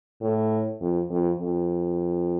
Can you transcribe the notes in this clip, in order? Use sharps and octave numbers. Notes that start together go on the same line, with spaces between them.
A2
F2
F2
F2